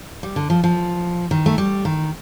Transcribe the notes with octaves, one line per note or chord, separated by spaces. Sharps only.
G3
D3
F3
F3
D#3
A3
G3
D#3